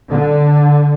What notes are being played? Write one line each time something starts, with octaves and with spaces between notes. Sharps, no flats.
D3